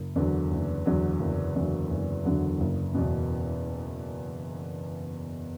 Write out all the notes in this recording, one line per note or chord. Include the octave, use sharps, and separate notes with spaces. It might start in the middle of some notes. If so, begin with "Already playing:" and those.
Already playing: F#1
E2 D3 F#3
F#1
E2 D3 F#3
F#1
E2 D3 F#3
F#1
E2 D3 F#3
F#1
E2 B2